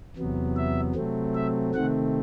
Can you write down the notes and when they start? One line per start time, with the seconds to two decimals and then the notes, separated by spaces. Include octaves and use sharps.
0.16 E2 C3 F#3 B3
0.56 E5
0.95 C3 F#3 A3 C4
1.35 E5
1.74 C3 D#3 A3 C4 F#5